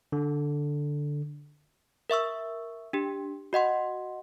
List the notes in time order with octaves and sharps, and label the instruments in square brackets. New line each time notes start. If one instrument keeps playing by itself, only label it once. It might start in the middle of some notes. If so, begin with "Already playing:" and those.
[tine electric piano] D3
[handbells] A#4 E5 C#6 E6
D4 G4
F#4 D#5 F#5 C6